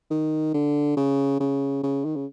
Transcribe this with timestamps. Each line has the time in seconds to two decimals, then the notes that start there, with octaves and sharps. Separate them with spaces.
0.11 D#3
0.54 D3
0.97 C#3
1.40 C#3
1.83 C#3
2.05 D#3
2.16 C#3